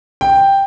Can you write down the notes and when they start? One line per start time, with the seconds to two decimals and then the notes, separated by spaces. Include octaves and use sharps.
0.21 G5